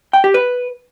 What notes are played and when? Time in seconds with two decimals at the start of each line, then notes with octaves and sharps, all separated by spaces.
0.13 G5
0.24 G4
0.34 B4